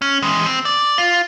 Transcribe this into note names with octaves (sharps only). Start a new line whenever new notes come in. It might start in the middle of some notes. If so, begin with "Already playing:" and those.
C#4
E3 G#3
C4
D5
F4